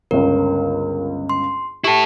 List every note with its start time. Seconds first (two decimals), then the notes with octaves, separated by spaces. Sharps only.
0.11 G1 C#2 A#4
1.29 C6
1.84 E4 G4 A4 C#6